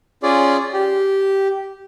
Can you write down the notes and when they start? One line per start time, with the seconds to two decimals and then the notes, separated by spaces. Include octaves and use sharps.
0.23 C#4 F4 G#4 D5
0.73 G4